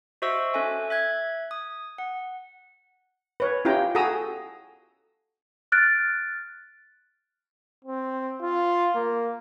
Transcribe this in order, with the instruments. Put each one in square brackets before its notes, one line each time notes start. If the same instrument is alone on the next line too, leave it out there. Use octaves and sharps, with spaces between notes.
[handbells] F#4 C5 D#5 E5 C#6 E6
C#4 A4 E5 G#5
E5 F#6 G#6
D#6
F#5
[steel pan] B4 C#5
C#4 E4 F4 G4 G5 A#5
F#4 G#4 A4 A#5 D#6 E6
[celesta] F6 F#6 A6 D7
[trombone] C4
F4
A#3